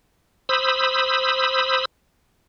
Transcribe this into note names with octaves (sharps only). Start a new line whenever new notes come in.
C5 B5 D#6 E6